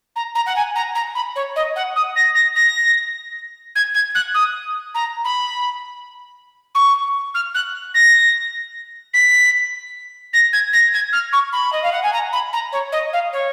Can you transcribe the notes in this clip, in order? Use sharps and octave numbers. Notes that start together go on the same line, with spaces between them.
A#5
A#5
F#5
G#5
A#5
A#5
B5
C#5
D#5
F#5
D#6
A#6
A#6
A#6
G#6
G#6
F#6
D#6
A#5
B5
C#6
F6
F#6
A#6
B6
A#6
G#6
A#6
G#6
F6
C#6
B5
D#5
F5
F#5
G#5
A#5
B5
A#5
C#5
D#5
F5
C#5